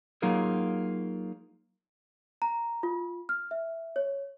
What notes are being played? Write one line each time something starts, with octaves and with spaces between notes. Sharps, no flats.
F#3 A#3 D#4 F4 G#4 A#4
A#5
F4
F6
E5
C#5